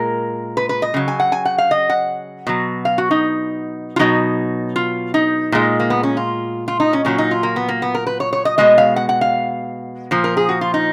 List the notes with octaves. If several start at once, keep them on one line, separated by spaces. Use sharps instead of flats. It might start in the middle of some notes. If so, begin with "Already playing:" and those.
Already playing: A#2 G#3 A#4
B4
B4
D#5
C#3 F#3
G#5
F#5
G#5
F#5
F5
D#5
F#5
B2 F#3
F5
F#4
D#4
F4
B2 F#3 D#4
F4
D#4
A#2 G#3
A#3
B3
C#4
F4
F4
D#4
C#4
A#2 F#3 C#4
D#4
F4
A#3
B3
A#3
B3
A#4
B4
C#5
C#5
D#5
B2 G#3 D#5
F5
F#5
F#5
F5
A#2 F3
A#4
G#4
F#4
F4
D#4